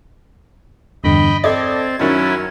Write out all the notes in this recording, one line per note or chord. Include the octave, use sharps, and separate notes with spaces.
E2 G2 D3 D#5 G5 B5
C4 A4 D5 D#5 G#6 A6
F#2 D#3 F#3 C#4 E4